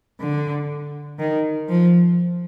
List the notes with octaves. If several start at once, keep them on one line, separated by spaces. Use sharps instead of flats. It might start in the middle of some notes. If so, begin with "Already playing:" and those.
D3
D#3
F3